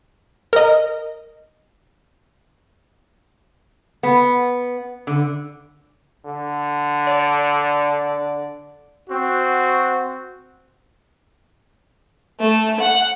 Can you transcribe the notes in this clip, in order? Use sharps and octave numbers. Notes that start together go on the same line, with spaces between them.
A#4 D#5
B3
D3
D3
D5
C4 F#4
A3
F#5